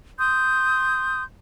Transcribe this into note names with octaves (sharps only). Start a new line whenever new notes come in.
C6 D#6 G6